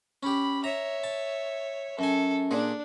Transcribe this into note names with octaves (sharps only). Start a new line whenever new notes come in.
C#4 G4 B5
C#5 E5 A#5
A5
F#2 A4 G#5
A#2 D4 G#4